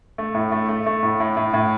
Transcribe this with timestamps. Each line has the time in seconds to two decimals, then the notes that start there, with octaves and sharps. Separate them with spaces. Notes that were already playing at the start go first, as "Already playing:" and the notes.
0.18 A3
0.35 A2
0.52 A3
0.69 A3
0.86 A3
1.03 A2
1.20 A2
1.37 A2
1.54 A2